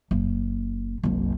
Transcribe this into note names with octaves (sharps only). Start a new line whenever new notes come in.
F#1
F#1 C2